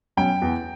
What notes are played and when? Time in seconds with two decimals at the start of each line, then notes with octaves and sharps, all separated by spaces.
0.17 B2 F#3 C#4 G5
0.42 E2